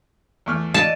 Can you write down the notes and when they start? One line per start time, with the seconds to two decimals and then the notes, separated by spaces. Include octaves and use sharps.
0.46 E2 A3 F6
0.74 D5 D#5 A5